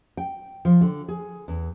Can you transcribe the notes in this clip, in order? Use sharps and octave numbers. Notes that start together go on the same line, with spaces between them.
G5
F3
D3
G#4
E2